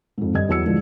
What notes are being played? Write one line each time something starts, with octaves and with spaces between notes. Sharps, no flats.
F2 G#2
G2 D#5 G#6
E2 F#3 E6 C#7
G#2 D3 E3 F3 G#3